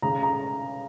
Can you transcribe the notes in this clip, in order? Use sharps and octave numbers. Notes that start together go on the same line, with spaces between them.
C#3 A#5
A#5